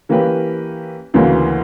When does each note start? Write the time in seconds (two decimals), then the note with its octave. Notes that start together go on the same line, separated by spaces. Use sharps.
0.09 E3 A#3 C#4 G4 B4
1.14 D2 C#3 E3 A#3 C#4